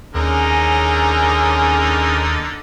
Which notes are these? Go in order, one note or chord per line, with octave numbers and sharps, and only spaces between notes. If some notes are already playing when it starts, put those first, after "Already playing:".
D#2 D3 C#4 D#4 G#4 A#4